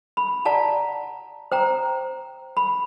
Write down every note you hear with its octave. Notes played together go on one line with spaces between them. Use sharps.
B5
D5 F#5 A5 A#5
C5 G5 A#5
B5